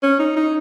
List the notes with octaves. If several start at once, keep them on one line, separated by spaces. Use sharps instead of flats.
C#4
D#4
D#4